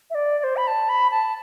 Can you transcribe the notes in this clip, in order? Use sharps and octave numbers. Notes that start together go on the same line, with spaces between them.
E5
D5
D5
C5
B5
A5
B5
A5